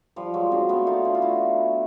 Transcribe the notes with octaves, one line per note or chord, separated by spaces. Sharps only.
F3 G3
F#3 G#3
C4 D4
A3 B3
D#4 F4
D4 E4
F4
E4 F#4